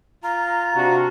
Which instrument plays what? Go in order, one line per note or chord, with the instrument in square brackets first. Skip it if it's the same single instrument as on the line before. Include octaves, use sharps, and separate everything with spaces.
[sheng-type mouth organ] F4 [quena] A#5
[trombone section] C3 D4 F#4